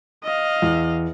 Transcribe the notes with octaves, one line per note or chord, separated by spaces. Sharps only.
D#5 F5
E2